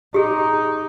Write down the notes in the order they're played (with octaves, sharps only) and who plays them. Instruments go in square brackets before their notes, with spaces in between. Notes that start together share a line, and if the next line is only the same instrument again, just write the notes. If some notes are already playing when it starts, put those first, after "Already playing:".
[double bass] D#4 [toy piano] G4 G#4